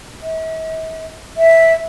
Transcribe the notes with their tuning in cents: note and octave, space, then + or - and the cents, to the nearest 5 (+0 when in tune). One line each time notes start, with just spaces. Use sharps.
E5 -45
E5 -5